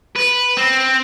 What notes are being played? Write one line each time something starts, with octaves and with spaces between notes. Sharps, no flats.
B4
C4